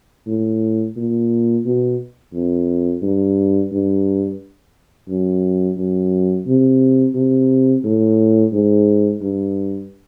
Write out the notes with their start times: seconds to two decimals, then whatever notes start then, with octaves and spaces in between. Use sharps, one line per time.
0.27 A2
0.97 A#2
1.65 B2
2.34 F2
3.03 G2
3.72 G2
5.09 F#2
5.78 F#2
6.47 C3
7.15 C3
7.84 A2
8.53 G#2
9.22 G2